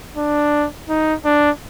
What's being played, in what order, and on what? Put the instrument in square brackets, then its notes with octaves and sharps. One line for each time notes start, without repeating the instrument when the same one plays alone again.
[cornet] D4
D#4
D4